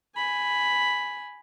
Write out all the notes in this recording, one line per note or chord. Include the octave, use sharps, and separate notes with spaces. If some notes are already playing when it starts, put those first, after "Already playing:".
G#5 B5